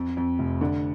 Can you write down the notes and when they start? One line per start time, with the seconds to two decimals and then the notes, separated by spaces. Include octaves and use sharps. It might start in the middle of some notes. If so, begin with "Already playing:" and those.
Already playing: F2
0.17 F2
0.39 F1
0.61 D3